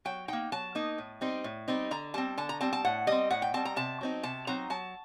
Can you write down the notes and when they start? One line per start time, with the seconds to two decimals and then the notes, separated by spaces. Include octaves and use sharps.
0.05 F#3 G5
0.28 A#3 D#4 G5
0.52 F#3 A5
0.75 A#3 D#4
0.98 A2
1.21 G3 C4 D#4
1.44 A2
1.68 G3 C4 D#4
1.91 D3 A#5
2.14 G3 C4 A5
2.38 D3 A5
2.49 A#5
2.61 G3 C4 A5
2.73 A5
2.85 A2 F#5
3.07 G3 C4 D#5
3.30 A2 F#5
3.42 G5
3.54 G3 C4 A5
3.65 A#5
3.76 C3 A5
4.01 F#3 C4 D#4
4.23 C3 A5
4.47 F#3 C4 D#4 A#5
4.70 F#3 A5